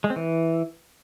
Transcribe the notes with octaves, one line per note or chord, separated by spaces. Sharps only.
G#3
C4
E3